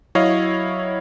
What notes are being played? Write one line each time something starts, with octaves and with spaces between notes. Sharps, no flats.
F#3 E4 C#5 D#5 F5